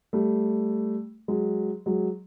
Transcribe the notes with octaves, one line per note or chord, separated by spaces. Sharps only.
G3 A3
F#3 G#3
F#3 G#3